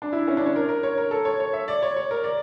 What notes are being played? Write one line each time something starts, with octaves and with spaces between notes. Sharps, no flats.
D4
E4
C#4
D4
C#5
A#4
A#4
C#5
A#4
A4
C#5
C#5
E5
D5
C#5
C#5
A#4
D5